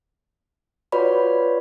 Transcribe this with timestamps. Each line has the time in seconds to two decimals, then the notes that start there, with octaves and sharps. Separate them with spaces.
0.92 F4 F#4 B4 C#5 D5 B5